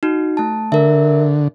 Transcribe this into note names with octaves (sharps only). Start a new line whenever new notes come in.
D#4 F#4
A3 A5
D3 A#4 E5